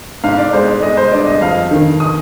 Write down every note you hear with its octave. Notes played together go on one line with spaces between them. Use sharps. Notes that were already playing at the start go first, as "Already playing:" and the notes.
G#2 F5
D5
G#3 C5
D5
G#3 D#5
C5
G2 D5
D#5
F2 F5
D#3
D#6